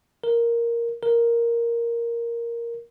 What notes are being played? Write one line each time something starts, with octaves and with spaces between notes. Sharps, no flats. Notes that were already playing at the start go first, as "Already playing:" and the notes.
A#4
A#4